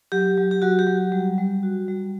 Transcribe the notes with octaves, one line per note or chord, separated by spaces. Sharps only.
F#3 G4
F#3
G4
F#3 F#4
G4
F#3
G3
G3
F#4
G3